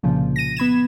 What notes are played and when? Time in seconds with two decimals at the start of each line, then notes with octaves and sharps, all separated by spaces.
0.03 C2 A#2 C#3 F3
0.36 A#6 D#7
0.57 B3 B5 G#6 E7